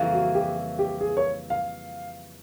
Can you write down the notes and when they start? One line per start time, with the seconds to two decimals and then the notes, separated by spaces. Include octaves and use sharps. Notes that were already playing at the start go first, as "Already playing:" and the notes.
Already playing: F2 C#3 E3 G3 A#3
0.13 F#4
0.35 G4
0.79 G4
1.01 G#4
1.17 C#5
1.50 F5